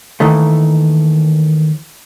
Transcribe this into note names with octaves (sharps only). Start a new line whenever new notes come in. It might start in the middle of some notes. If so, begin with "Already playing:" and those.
D#2 D#3 E3 A3